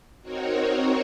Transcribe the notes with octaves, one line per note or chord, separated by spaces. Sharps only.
C4 D#4 F#4 A#4 C#5